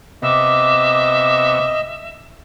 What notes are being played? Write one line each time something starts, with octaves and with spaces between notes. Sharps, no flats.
C3 B3 D#5 E5 D6